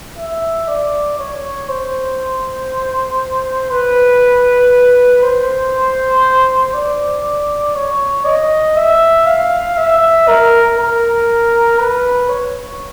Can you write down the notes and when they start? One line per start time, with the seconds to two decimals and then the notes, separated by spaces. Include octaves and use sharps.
0.17 E5
0.68 D5
1.19 C#5
1.69 C5
3.71 B4
5.23 C5
6.74 D5
7.75 C#5
8.25 D#5
8.76 E5
9.26 F5
9.77 E5
10.28 A#4
10.78 A#4
11.79 B4
12.29 C#5